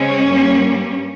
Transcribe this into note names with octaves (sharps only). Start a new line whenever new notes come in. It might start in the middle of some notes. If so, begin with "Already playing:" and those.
Already playing: C#3 G#3 C4 C#4
G2 G3 A#3